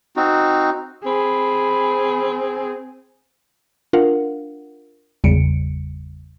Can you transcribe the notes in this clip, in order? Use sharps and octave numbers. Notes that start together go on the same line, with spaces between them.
C4 D#4 F#4
C4 G#4 B5
D4 F4 A#4 F5 F#5
G#1 E2 C#3 G3 C#7 D7